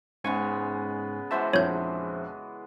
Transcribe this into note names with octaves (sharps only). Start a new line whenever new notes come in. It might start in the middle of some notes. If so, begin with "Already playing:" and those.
G#2 C#3 G#3 B3 G#5 C#6
E3 G#3 F#4 C5 E5 A5
A#1 F2 C#5 G6